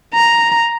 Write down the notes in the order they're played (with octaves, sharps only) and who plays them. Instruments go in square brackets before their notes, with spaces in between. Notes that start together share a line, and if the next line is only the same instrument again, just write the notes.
[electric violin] A#5